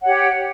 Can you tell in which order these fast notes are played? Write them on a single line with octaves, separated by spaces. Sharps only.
F#5 C#5 G4